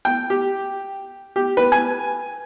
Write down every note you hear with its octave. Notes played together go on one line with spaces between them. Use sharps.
G5
G4
G4
B4
G#5